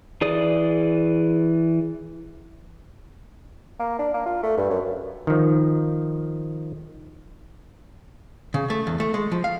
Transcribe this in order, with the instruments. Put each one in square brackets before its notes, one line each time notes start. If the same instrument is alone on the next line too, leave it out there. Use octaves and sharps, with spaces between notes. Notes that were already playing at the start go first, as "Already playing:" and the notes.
[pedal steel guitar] E3 G#4 D5 D#6
[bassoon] A#3
D4
A#3
F4
A3
G2
F#2
[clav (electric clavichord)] D#3 F3
[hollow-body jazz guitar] C#3
A3
E2
A3
G#3
F3
F5